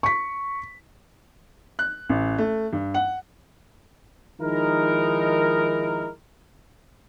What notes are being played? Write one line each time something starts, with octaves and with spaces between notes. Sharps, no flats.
C#6 B6
F#6
A1
A3
G2
F#5
D#3 F3 G#3 D#4 E4 A#4